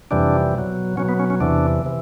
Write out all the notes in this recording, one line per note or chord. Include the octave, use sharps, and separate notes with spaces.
F2 C3 E3 G3 D4
B2 F#3
B2 F#3 C#4
B3
C#4
C#4
E2 C3 E3 D4
C3 E3